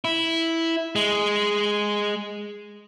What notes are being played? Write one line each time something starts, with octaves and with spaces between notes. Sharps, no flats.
E4
G#3